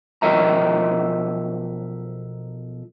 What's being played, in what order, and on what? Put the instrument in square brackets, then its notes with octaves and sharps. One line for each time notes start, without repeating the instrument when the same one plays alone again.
[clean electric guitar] B1 F3 A#4 D#5 E5 A#5